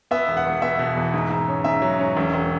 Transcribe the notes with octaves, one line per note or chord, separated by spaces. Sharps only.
B3 E5
E1
F#5
E1
B3 E5
B2
E2
G#2
G#2
C#4
G#2 E5
F#3
C#4
E1
E1